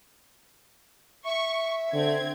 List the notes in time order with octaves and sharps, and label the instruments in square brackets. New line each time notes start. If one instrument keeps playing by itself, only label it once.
[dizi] E5 [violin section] C#6
[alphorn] D3 [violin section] C4 G#6